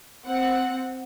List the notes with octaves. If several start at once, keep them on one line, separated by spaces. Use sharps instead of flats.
C4 F#5